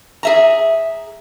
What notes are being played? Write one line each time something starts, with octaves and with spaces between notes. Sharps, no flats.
G#4 E5 A#5